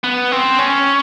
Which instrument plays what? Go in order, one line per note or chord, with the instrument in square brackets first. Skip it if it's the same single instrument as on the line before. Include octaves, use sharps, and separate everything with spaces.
[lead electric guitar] B3
C4
C#4